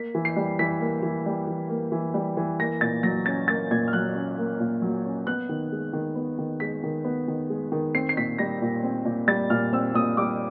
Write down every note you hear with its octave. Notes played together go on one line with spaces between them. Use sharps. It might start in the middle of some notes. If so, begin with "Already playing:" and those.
Already playing: A#3 B6
E3
C7
G3
E3 B6
A#3
E3
G3
E3
A#3
E3
G3
E3
A#3 A#6
A#2 A6
F#3 A#6
C#4 A6
A#3 A6
A#2 G#6
F6
F#3 F#6
C#4
A#3
A#2
F#3
C#4
B3 F#6
D#3
G#3
D#3
B3
D#3
G#3 B6
D#3
B3
D#3
G#3
D#3
C4 C7
C7
A#2 B6
G3 A#6
A#2
C4
A#2
G3 A6
A#2 F6
C4 E6
A#2 D#6
G3 D6